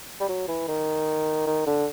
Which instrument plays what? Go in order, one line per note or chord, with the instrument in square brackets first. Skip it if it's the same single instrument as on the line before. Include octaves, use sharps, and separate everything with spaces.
[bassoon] G3
F#3
E3
D#3
D#3
D3